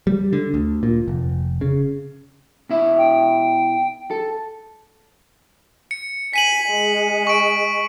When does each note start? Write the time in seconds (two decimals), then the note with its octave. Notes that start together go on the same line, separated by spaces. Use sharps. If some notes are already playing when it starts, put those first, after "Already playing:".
0.07 G3
0.33 D3
0.54 D2
0.83 A#2
1.08 F1
1.61 C#3
2.69 B2 E4 E5
2.98 G5
4.11 A4
5.91 C#7
6.33 G#5 B6 D#7 F#7
6.71 G#3
7.27 C#6 D7